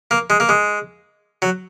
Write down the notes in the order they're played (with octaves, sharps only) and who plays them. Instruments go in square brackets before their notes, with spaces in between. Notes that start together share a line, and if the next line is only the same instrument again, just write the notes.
[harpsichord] A#3
G#3
A#3
G#3
F#3